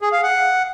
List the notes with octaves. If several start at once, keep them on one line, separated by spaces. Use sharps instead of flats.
G#4
F5
F#5